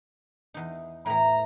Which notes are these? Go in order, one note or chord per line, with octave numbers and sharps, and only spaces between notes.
E2 D#4
A2 E3 A#5